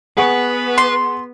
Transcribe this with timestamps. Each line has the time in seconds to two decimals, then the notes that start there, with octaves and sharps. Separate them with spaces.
0.17 B3 G#4 B4 F#5 C#6
0.78 C6